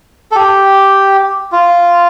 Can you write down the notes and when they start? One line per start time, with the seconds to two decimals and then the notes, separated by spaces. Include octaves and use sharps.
0.32 A4
0.35 G4
1.52 F4